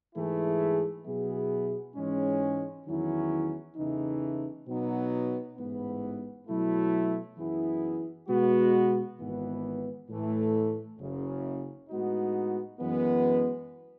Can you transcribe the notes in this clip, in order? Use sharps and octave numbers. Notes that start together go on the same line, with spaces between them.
G#2 E3 A3 E4 G#4
B2 F#3 B3 E4 G#4
G#2 E3 G#3 C#4
E2 D#3 F#3 C#4 E4
E2 C#3 E3 A3 D#4
B2 F#3 B3 D#4
A1 G#2 E3 B3
B2 F#3 A3 E4
F#2 E3 B3 E4 G#4
B2 G#3 B3 F#4
G#1 G#2 E3 B3
A2 E3 A3
F#1 F#2 C#3
A2 G#3 B3 D#4 F#4
F#2 E3 G#3 B3